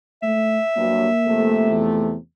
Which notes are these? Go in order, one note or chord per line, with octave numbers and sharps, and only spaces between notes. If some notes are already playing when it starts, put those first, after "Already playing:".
A3 E5
G2 F#3 A#3
C3 F3 A3
E2